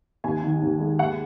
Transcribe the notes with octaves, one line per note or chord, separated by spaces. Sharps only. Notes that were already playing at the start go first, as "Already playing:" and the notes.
D#2 G#5
D#3
D#2
G#3
D#2 F#5